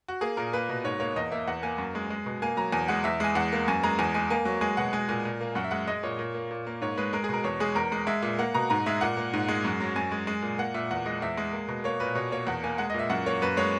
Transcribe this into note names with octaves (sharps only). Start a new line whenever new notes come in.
F#4
A#3 G#4
A#2 A#4
A#3 B4
B2
G#2 C#5
A#3 C#5
E2 D#5
A#3 E5
E2 F#5
A#3 G#5
F#2
G#3
G#3
B2
A#3 G#5
F#3 A#5
E2 G#5
G#3 F#5
E2 E5
G#3 G#5
E2 F#5
A#3
F#2 G#5
G#3 A#5
E2 G#5
G#3 G#5
A#3 G#5
F#3
G#3 G#5
B2 F#5
G#3 G#5
A#2 G#5
A#2
A#3
F#2 F#5
E5
G#3 F#5
G#3 D#5
A#2 C#5
A#2
A#3
A#2
A#3
G#2 C#5
G#3 B4
G#3 A#4
G#4
B2 A#4
E2 C#5
G#3 G#4
E2 A#4
G#3
G#3 E5
A#2 E5
A#3 F#5
B2 A#5
G#2 A#5
G#3 E5
A#2 F#5
A#3
G#2
G#3
F#2
F#3
F#2 G#5
G#3
G#3
A#2
A#3 F#5
A#2 E5
E2 F#5
G#3 D#5
E2 E5
G#3
A#3
B2
A#3 C#5
A#2 B4
B2 C#5
A#3 C#5
E2 F#5
A#3 G#5
G#3 F#5
D#5
A#2 E5
F#2 F#5
A#3 C#5
F#2 B4
G#3 C#5